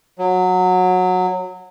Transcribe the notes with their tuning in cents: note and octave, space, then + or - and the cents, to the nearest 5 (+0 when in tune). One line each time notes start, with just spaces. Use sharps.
F#3 -15